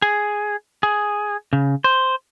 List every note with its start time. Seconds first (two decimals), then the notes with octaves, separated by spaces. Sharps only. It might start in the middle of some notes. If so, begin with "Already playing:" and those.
0.02 G#4
0.83 G#4
1.53 C#3
1.84 C5